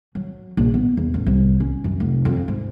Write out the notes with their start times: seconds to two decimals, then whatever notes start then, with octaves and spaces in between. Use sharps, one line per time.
0.15 F#3
0.57 A#1
0.74 B3
0.97 E2
1.14 A1
1.26 C2
1.60 C#4
1.84 F#2
2.00 F1
2.25 F2
2.48 G#2